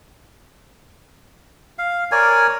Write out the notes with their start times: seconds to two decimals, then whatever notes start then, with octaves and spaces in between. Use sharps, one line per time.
1.78 F5
2.12 A#4 C#5 D5 G#5